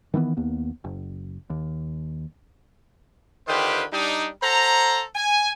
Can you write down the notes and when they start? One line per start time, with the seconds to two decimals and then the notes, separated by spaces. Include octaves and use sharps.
0.14 D#3 E3 A#3 B3
0.37 D#2 A#3 B3
0.84 F#1
1.50 D#2
3.48 D3 D#3 F4 G4 B4 C5
3.93 G3 D4 D#4
4.43 A4 C5 F#5 A#5
5.15 G#5